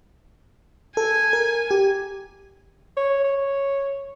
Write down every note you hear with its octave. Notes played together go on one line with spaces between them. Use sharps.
A4 G#5
A#4
G4
C#5
C#5